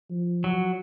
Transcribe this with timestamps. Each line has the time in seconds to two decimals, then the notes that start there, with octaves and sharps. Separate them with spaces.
0.10 F3
0.44 F#3